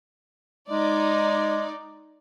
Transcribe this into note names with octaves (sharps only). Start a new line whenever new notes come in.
G#3 D#4 D5